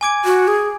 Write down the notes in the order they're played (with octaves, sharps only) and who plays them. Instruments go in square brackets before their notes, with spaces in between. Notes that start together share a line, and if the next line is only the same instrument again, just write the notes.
[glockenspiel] G#5 D6 G#6 D7
[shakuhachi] F#4
G#4